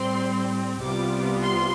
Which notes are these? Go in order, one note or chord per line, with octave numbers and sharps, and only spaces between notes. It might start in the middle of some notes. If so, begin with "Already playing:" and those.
Already playing: A2 G3 C4 C6
C2 C3 G3 B3 F4 D6
C6